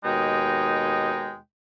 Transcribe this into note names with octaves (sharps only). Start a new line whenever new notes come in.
D#2 B2 G#3 D#4 G5